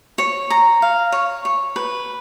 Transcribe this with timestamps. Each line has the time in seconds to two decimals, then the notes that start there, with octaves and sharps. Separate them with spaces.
0.18 C#5
0.50 A#5
0.82 F5
1.12 C#5
1.45 C#5
1.76 B4